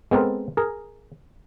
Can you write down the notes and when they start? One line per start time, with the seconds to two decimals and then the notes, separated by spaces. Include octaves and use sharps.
0.11 G#3 B3 C4 A4 A#4
0.57 G#4 A#4